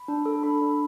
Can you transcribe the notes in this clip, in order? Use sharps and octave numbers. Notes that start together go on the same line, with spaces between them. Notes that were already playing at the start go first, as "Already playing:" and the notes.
Already playing: B5
D4
A4
D4 B5
D4